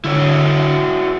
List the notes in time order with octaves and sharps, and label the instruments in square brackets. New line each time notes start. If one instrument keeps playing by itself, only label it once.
[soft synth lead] D3 [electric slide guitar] E4 F#4 C#5